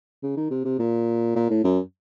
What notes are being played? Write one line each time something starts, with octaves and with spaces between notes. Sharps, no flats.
C#3
D#3
C3
C3
A#2
A#2
A2
F#2